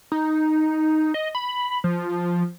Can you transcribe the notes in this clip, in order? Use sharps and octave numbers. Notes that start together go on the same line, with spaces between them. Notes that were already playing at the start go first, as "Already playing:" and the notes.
D#4
D#5
B5
F3